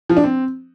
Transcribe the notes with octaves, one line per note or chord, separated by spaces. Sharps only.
F3
D4
C4